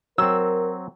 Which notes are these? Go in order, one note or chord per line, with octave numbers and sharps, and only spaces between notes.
F#3 C4 A#4 E6